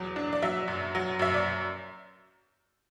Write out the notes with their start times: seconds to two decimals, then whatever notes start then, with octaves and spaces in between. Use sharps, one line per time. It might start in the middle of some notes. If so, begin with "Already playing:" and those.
Already playing: E2 F#3
0.16 D4
0.33 D5
0.42 F#3 E5
0.68 F#2
0.95 F#3
1.19 F#2 E5
1.34 D5